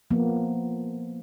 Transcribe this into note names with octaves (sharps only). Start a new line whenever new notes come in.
F3 A#3 B3